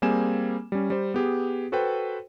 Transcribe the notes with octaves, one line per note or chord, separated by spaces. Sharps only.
G3 A#3 C4 G#4 G#5 E7
G3 C#4
G3 C5
B3 G4 G#4
F#4 A4 B4 C5 G5